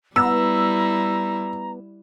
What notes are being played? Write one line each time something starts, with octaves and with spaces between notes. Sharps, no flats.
G3 B3 E4 A#5 E6